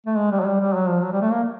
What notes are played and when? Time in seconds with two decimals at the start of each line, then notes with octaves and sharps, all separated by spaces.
0.06 A3
0.17 G#3
0.32 G3
0.40 F#3
0.46 G3
0.61 G3
0.75 F#3
0.89 F3
1.03 F#3
1.12 G3
1.22 A3
1.32 A#3